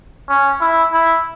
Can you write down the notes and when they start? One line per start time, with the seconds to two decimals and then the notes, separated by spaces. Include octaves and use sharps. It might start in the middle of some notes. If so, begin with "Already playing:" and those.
0.29 C#4
0.61 E4
0.93 E4